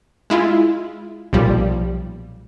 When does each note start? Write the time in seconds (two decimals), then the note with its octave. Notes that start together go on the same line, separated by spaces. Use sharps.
0.30 G#3 E4 F4
1.33 B1 A#2 F3 G3